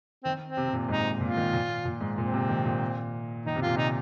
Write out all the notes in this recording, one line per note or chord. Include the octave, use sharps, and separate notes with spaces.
D#3 C4
C4
C3
C3
A#2
G#2 D#4
A#2 F4
D#3
A#2
A#2
G#2
A#2 C4
C3
D#3
A#2
D#3 D#4
C3
A#2 F4
C3 D#4